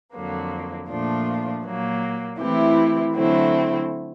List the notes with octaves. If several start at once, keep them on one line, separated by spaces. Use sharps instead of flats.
F2 D3 F#3 A#3
A#2 F3 A3 D4 F4
A#2 F#3 A#3
E3 A3 C4 E4 G4
D3 F#3 A3 C4 E4